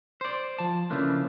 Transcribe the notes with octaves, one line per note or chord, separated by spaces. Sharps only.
C5 D5
F3 A5
C#3 E3 F3 A3 A#3 D4